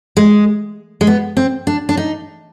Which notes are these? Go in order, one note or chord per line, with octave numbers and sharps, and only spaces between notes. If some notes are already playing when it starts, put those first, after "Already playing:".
G#3
G#3
B3
C4
D4
D4
D#4